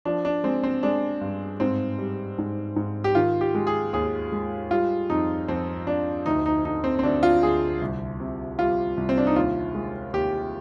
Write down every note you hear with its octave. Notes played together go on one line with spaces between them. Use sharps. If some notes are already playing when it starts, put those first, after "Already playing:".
F3 D4
D4
G#3 C4
C4
G#3 D4
G2
G#2 C4
G3
G#2
G#2
G4
D#3 F4
G4
G#3
G#4
D#2 G#4
G#3
G3 F4
F2 D#4
F2 C4
F2 D4
D2 D#4
D#4
D3 D#4
C4
C4
D2 D4
F4
D2 G#4
C2
C3
G3 F4
C2
C4
D4
D#4
D#2 F4
G#3
D#2 G4